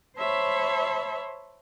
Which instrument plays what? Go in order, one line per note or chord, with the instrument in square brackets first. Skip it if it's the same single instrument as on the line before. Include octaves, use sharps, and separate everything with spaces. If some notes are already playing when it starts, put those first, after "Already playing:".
[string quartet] C5 C#5 E5 A5 B5